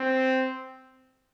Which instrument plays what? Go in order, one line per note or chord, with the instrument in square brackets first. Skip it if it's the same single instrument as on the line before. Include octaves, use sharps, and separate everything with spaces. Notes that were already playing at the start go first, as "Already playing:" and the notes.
Already playing: [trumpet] C4